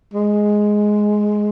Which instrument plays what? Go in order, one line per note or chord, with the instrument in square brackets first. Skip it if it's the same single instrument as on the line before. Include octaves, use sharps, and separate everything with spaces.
[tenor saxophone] G#3